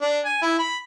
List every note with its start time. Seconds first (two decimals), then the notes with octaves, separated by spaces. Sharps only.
0.01 D4
0.25 G#5
0.42 E4
0.59 B5